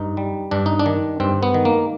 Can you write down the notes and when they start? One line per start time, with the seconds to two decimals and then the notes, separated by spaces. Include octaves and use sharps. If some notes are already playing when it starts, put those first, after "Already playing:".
Already playing: G2 D#4
0.17 G3
0.51 G2 D4
0.66 D#4
0.79 D4
0.86 D#3
1.20 G2 C4
1.43 B3
1.54 D#3
1.65 A#3